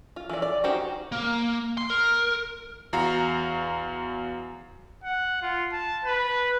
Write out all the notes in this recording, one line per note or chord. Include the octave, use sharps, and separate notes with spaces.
F4
E3 D5
D5
C#4 D#4 F#4 G4 C5
A#3
C6
A#4
E2 F#4 F5 A#5
F#5
F4
A5
B4